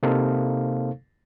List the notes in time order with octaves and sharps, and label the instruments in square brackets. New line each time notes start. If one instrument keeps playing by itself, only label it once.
[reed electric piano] C3 A#3 D#4 A4 C5 F5